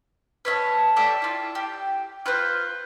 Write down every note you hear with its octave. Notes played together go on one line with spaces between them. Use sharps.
B4 C#5 E5 A5
G4 A4 D5 E5
E4 F4
G4
F4 B4 C5